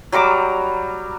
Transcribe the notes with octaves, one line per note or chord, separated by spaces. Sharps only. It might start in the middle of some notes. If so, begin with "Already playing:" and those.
F#3 G3 A#5 D6